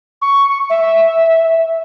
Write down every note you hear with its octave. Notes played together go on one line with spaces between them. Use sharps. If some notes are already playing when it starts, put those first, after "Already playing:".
C#6
E5